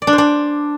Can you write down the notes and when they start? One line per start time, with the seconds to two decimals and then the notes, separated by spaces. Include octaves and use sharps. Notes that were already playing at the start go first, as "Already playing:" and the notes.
0.02 D5
0.07 D4
0.13 C5
0.18 D4